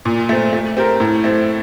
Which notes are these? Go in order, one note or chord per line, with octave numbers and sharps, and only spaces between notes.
A#2
A3 C4
A3
C4 G4 A#4
A2
A3 C4